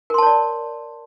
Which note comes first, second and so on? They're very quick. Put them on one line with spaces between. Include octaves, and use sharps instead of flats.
A#4 C6 A5 C#5 D5